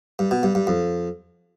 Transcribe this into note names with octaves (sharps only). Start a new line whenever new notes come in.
G2
B2
G2
G2
F2